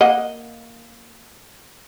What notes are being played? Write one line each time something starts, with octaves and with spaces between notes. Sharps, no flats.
A#3 D#5 F#5